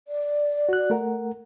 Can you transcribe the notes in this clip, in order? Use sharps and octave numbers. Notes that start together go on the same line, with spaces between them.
D5
F#4 F#6
A3 A#4 F#5